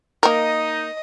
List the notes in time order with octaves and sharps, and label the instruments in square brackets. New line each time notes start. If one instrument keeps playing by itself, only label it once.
[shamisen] A#3 A#4 [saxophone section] D#4 [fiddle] D#5